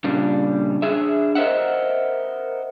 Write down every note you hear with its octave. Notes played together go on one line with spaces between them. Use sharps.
A#2 C#3 G3 D4
D4 G#4 E5
A#4 C5 D#5 E5 F#5